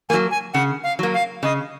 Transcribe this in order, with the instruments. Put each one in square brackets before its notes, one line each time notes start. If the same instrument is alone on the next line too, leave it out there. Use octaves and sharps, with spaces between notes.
[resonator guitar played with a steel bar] F#3 A#3 [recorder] G#5
[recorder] G#5
[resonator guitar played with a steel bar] C#3 [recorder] F#5
[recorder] F5
[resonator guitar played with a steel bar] F#3 A#3
[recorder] F5
[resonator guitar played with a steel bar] C#3 [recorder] D#5